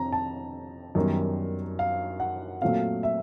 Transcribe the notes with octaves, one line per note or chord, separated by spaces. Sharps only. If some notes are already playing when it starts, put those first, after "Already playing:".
Already playing: F2 C3 A#5
A5
F#2 D#3 G3 B3
F5
F#5
A#2 F#3 A3 C4 F5
E5